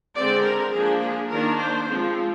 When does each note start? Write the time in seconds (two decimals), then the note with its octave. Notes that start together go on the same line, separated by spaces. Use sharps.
0.16 D3 G#3 C4 D5
0.44 A#4
0.72 F3 A#3 D4 G#4
1.01 G#4
1.30 D#3 A#3 D4 A#4
1.59 C5
1.88 F3 G#3 C4